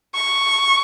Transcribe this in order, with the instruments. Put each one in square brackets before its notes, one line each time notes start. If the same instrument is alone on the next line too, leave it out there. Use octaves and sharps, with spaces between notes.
[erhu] C#6